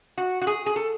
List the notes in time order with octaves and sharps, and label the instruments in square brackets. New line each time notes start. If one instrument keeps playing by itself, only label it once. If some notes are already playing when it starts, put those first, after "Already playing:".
[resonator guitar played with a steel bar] F#4
F#4
G#4
G#4
A4